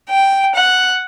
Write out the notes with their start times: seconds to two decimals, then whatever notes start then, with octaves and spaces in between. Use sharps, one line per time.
0.11 G5
0.56 F#5